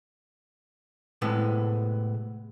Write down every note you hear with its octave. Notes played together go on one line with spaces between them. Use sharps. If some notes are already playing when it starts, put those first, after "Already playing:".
A2 C3 G#3 B3